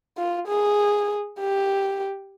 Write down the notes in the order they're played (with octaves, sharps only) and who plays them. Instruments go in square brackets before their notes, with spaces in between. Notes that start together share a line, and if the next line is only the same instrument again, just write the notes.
[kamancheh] F4
G#4
G4